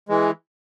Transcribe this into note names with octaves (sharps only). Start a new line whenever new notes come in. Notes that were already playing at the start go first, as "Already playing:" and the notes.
E3 G#3